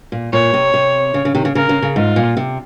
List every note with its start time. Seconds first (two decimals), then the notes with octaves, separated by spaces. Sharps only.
0.12 A#2
0.33 A#2 C#5
0.54 C3
0.74 C3
1.14 C#3
1.25 C#3
1.35 C3 D#3
1.45 C#3
1.55 C#3 A#4
1.69 C#3
1.82 C#3
1.96 G#2 F4
2.16 A#2
2.37 C3